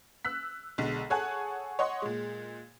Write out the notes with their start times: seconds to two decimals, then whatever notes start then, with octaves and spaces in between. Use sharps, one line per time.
0.25 E6 F#6 B6
0.78 B1 D3 G#3
1.10 G#4 A4 C#5 F#5 G#5 F#6
1.79 C#5 D#5 F#5 C6
2.02 A#2 G#3